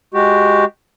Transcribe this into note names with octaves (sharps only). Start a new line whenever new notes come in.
G#3 F#4 G4